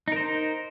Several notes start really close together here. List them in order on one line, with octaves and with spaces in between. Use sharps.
D#4 A#4 C5